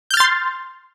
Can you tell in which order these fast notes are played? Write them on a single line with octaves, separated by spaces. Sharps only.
G6 F6 A6 C6